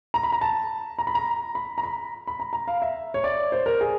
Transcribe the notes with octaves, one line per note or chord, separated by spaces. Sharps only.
A#5
B5
A#5
A5
A#5
B5
A#5
B5
A#5
B5
B5
A#5
A#5
F5
E5
C#5
D5
C5
A#4
G#4